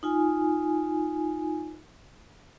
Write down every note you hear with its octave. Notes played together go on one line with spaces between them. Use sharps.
D#4 F4 G#5